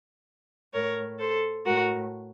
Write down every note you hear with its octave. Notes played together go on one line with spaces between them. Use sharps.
A2 A#4 C#5
A4 C5
A2 F#4 A#4